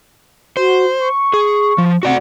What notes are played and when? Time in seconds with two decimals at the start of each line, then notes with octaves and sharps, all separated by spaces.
0.57 F#4 C5
1.00 C#6
1.34 G#4
1.78 F3
2.03 C3 F#4 D5 F#5